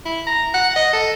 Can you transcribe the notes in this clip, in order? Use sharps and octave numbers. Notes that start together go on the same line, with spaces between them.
E4
A#5
F#5
D#5
A4